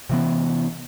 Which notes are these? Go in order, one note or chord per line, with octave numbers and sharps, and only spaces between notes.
C3 E3 B3